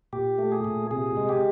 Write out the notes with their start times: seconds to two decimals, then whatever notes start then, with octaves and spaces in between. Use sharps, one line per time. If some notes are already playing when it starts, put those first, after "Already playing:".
0.13 A#2 G4
0.38 A3
0.52 G#4
0.65 A#2
0.91 C3 G#4
1.17 G#3
1.29 G4